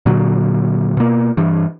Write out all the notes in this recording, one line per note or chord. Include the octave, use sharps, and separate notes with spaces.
A#2 D3 F#3
B2 A#3
G2 E3